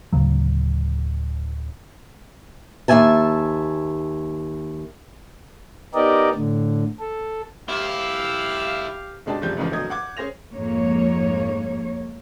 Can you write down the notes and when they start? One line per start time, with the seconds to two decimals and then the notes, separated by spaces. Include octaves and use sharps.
0.13 D1 C#3 F#3
2.88 D#2 F#3 E5 G#5 A5
5.94 B3 D#4 G4 A#4 D5 D#5
6.34 A2 D3
7.00 A4
7.68 B1 E4 G4 F5
9.26 F#1 B2 G#3 D4 G4 A5
9.41 F#1 C3 F3 G3 G6
9.57 C2 F2 G#2 C#3 E3 F3
9.71 G#1 D2 B2 F#3 D#5 G#6
9.90 F#5 D6 G#6
10.17 C#4 G#4 C5 A#6 F7
10.55 F2 G#2 A#3 C#5